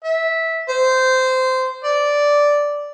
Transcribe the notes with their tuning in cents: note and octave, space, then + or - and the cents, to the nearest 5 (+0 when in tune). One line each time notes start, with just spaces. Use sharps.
E5 -15
C5 -15
D5 -5